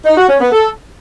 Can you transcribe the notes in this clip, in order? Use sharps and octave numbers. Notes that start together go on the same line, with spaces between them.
D#4
F#4
C#4
B3
A4